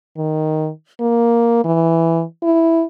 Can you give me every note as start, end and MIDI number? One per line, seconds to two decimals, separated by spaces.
0.17 0.69 51
1.00 1.64 58
1.65 2.23 52
2.43 2.85 64